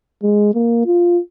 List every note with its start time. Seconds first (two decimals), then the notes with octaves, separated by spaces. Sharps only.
0.23 G#3
0.54 A#3
0.86 F4